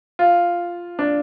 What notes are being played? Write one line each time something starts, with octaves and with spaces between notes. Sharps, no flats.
F4
D4